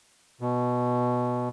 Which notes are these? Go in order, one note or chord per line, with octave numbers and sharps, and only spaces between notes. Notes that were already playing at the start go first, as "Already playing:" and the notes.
B2